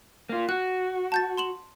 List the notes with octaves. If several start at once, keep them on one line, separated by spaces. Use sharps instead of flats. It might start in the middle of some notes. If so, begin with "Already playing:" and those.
A#3 F4
F#4 F#6
A5 G6 A6
C6 E7 F#7